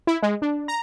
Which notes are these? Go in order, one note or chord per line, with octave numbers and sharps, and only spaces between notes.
E4
G#3
D4
A#5